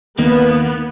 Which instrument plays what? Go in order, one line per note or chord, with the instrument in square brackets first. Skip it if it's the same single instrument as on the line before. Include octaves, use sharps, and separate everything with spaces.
[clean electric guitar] D#2 D#3 A#3 [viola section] B3